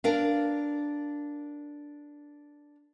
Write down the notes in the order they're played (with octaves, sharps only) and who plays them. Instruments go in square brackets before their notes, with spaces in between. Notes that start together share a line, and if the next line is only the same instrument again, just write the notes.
[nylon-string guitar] D4 A#4 F5